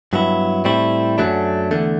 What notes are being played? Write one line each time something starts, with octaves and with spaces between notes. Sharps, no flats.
G2 F#3 B3 E4
A2 G3 C4 E4
F#2 F#3 A3 D4
E2 D3 A3